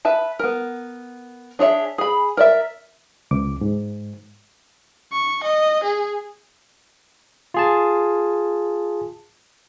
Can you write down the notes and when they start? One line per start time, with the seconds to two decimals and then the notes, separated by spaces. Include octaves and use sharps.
0.05 B4 E5 A5
0.39 B3 A#4
1.59 D4 G#4 C#5 E5
1.98 G#4 B5
2.37 A#4 D5 E5
3.31 C#2 D6
3.61 G#2
5.12 C#6
5.44 D#5
5.84 G#4
7.54 F4 G#4 A5